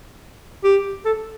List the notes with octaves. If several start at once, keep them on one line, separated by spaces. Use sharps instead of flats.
G4
A4